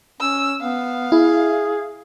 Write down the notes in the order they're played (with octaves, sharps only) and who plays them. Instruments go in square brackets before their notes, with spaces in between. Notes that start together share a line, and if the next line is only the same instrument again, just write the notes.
[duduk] C#4 [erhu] E6
[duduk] B3 [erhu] F5
[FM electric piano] E4 [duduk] G#4